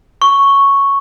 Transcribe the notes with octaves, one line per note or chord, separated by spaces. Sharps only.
C#6